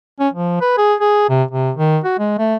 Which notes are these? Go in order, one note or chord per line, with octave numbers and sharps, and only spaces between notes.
C#4
F3
B4
G#4
G#4
C3
C3
D#3
F#4
G#3
A3